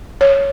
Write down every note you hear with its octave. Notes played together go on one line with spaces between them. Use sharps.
C#5